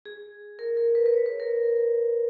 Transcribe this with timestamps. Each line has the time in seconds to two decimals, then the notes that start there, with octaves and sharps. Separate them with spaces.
0.05 G#4
0.59 A#4
0.77 A#4
0.95 B4
1.06 B4
1.13 C#5
1.26 B4
1.40 A#4